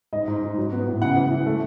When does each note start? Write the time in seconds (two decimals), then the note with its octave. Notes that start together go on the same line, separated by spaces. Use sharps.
0.13 G#2 D#5
0.28 G#2
0.43 G#2
0.58 F#3
0.73 B3
0.87 A2
1.02 C#3 F#5
1.16 E3
1.32 E3
1.46 A3